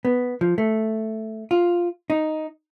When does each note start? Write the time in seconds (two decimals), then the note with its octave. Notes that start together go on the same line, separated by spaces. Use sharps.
0.05 B3
0.41 F3
0.58 A3
1.51 F4
2.10 D#4